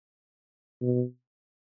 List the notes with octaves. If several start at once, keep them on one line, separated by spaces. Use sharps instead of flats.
B2